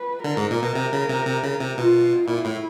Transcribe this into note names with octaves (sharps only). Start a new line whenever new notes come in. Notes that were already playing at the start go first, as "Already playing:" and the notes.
Already playing: B4
D3 A#4
G#2
A#2
B2
C3
C#3
C3
C3
C#3
C3
B2 F4
A#2 E4
A2